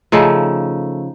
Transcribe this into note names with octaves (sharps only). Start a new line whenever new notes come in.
C#3 F3 A3 D#4